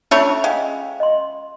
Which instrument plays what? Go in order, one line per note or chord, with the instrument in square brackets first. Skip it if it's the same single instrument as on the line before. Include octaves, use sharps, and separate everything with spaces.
[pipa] A3 D4 C#5 [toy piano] C#4 F4 E5
[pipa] G#3 [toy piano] F5 G5
[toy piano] D#5 C6